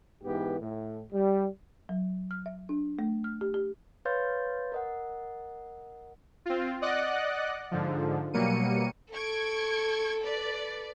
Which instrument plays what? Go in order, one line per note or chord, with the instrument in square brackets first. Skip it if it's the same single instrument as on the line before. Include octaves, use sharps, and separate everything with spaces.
[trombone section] G#2 E3 B3 G4
A2
G3
[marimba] F#3
F6
E5
D4
A3
F6
G4
G4
[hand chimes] B4 C#5 F5 C6 G6 A6
A#4 D#5 F#5
[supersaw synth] C4 F4
D5 D#5 F#5 F#6
G#2 D3 F3
B2 F#3 G3 A#3 C#7 D#7
[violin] A4 [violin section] C#6 G#6 D7
[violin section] B4 D5